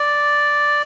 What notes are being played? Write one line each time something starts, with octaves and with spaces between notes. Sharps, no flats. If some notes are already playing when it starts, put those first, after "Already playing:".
Already playing: D5